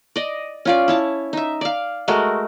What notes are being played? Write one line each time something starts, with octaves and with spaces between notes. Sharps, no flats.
D5 D#5
C#4 F4 D5
E4 C#5 A5
D#4 E5
D5 F5
G#3 A3 F#4 A#4